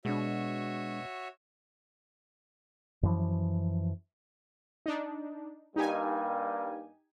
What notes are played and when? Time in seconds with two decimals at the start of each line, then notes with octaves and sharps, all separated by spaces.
0.05 B2 G#3 D4 F#4 C#5 E5
3.03 F#2 E3 F3
4.86 D4 D#4
5.76 G2 G3 A#3 D#4 G4 G#5